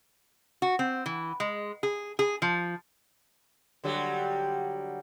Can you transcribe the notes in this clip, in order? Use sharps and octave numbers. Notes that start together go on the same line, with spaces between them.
F#4
C4
E3
G#3
G#4
G#4
F3
D3 F#3 G3